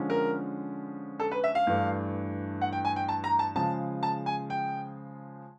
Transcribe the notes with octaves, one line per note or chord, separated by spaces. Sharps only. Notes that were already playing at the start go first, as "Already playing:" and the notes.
Already playing: D3 F3 G#3 C#4
A#4
A4
B4
E5
F5
G2 E3 A3 D4
F#5
G5
G#5
G5
A5
A#5
A5
C#3 F3 G#3 A5
A5
G#5
G5